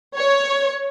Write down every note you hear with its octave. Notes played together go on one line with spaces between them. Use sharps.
C#5